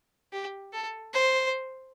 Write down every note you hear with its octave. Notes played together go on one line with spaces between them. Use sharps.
G4
A4
C5